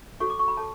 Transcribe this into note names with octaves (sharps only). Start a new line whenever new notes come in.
F#4 A4 C#5 C#6
D6
C#6
B5
A4 C#5 A5